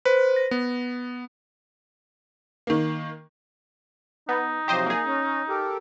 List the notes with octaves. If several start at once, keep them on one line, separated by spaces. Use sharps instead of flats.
B4 C5
A#6
B3
D#3 A#3
B3 D#4
C3 F3 F#3 G4 C5 D#5
A#3 G#4
C#4
G4 A4 A#4